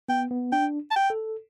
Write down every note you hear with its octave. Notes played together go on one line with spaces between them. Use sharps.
B3 G5
B3
D4 G5
A5
G5
A4